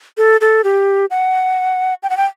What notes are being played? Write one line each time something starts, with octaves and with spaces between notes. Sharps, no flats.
A4
A4
G4
F#5
G5
F#5
G5